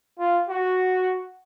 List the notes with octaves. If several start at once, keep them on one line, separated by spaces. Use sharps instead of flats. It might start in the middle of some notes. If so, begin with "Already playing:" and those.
F4
F#4